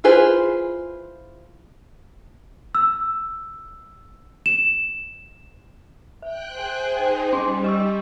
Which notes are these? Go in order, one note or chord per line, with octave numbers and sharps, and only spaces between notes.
E4 F4 G#4 B4 C5
E6
E7
E5 G5 F#6
G#4 C5
D#4 G5
G3 C#4 C6
D#5 C#6 E6